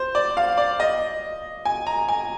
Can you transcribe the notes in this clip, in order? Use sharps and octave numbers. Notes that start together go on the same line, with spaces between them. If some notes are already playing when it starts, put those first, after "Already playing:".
Already playing: C5
D5
F5
D5
D#5
G#5
A#5
G#5